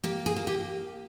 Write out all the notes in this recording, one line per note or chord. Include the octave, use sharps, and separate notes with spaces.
A#3 G4
G#4
A#3
G4